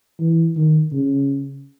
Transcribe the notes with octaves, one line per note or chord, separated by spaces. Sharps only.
E3
D#3
C#3